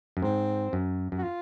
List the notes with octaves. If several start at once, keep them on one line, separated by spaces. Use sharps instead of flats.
F#2
G#2 C4
F#2
F#2
F#4
F4